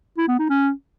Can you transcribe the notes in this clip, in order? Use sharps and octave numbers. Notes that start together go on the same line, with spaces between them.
E4
B3
D#4
C#4